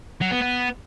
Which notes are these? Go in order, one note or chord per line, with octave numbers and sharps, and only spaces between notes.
F#3
B3
B3